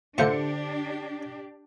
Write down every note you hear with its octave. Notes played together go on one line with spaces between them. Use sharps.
A2 D3 A3 D4 F4 G4 C5 C#7